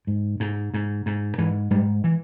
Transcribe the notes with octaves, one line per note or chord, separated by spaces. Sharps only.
G#2
G#2
G#2
G#2
G#2 E3
G#2 G3
E3